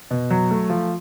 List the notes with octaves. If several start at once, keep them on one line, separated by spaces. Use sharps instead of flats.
B2
F#3
A3
F3